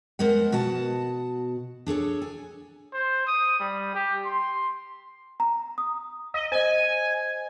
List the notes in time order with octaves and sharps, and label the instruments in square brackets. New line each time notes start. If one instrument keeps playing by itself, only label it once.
[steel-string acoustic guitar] G#3 B3 A#4 C5 F#5
B2 F#4 F#5 A5
D4 G#4 A4 C#5
G#5
[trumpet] C5
D#6
G3
G4
C6
[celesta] A#5
D#6
[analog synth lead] D#5
[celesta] C5 D#5 [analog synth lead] G#5